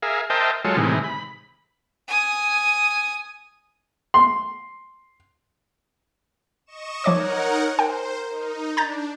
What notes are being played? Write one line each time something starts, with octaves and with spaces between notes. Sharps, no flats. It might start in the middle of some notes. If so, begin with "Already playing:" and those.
G#4 A#4 E5 F5
A#4 C5 D#5 E5 G5 A5
F#3 G#3 F4 A4 C#5
A2 C3 D#3 E3 G#3
B5
G#5 D#6
C6
D#5 C#6 E7
F3 D#4 A#4 C#5 D5 F#5 D6
A#4 C5 G5
D#4
D4 A#5 G6 A6